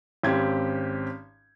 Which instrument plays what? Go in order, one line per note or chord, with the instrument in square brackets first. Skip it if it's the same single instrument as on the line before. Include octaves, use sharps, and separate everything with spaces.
[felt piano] G#1 C4 C#4 G4 G#6